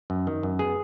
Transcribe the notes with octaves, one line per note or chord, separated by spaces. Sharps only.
F#2
D#3
F#2
B3 G#4